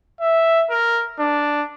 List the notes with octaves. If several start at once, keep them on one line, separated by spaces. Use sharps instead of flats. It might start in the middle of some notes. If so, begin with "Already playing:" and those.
E5
A#4
D4